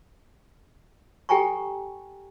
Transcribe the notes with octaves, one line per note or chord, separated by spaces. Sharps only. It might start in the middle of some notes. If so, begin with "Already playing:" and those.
G4 A4 G5 G#5 A#5 C#6